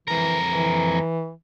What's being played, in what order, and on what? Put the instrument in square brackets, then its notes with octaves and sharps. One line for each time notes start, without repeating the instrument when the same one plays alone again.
[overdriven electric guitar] F2 A#4 [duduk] E3
[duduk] E3